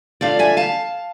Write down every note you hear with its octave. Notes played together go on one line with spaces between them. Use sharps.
D3 A3 D4 F4 D5 F5
E5 G#5
F5 A5